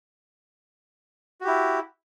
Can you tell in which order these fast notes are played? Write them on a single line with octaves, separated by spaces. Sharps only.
F#4 G4 E4